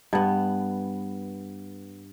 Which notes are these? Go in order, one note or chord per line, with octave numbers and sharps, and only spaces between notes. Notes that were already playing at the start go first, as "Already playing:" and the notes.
G2 B3